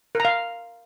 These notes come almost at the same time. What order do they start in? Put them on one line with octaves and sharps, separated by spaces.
A#4 A#5 F5